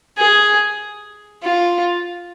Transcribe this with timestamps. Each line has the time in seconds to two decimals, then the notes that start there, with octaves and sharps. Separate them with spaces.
0.18 G#4
1.43 F4